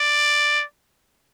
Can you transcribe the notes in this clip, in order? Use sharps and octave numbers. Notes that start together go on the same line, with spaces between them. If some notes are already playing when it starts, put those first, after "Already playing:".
Already playing: D5